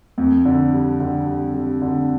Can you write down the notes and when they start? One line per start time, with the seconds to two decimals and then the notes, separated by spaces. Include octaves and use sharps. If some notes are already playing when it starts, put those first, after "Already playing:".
0.18 F2
0.45 D3
0.73 G3
1.00 D3
1.27 G3
1.54 G3
1.82 D3